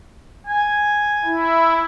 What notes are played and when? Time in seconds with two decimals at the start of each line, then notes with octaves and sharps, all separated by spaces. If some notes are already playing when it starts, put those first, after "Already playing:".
0.47 G#5
1.25 E4